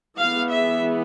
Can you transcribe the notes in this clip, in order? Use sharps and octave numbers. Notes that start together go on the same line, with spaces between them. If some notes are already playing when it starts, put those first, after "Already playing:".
E3 G#3 B3 F5
E5